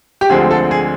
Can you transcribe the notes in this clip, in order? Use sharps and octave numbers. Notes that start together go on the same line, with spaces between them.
G4
D2 D3 F3 G#3 C4 G#4
A4
G#4